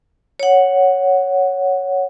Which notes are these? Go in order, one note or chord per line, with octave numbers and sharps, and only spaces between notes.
C#5 F#5